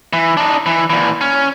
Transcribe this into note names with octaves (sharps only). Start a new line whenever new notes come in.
E3
D4 D#4
E3
A#2 E3
C#4